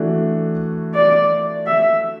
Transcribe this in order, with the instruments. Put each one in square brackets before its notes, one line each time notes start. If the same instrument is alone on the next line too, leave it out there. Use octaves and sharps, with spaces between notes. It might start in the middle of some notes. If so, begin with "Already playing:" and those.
Already playing: [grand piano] E3 A3 D4 F#4
[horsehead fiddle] D5
E5